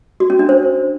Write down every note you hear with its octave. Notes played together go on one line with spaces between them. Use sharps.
F#4
C#4
D4
C5